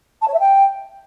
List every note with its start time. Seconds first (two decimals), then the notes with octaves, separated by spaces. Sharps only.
0.21 A5
0.27 C#5
0.33 E5
0.39 G5